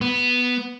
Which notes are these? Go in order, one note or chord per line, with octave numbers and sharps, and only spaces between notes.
B3